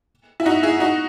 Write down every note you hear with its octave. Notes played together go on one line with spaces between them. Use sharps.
E4
D#4 F#4
E4 G#4
D#4 F#4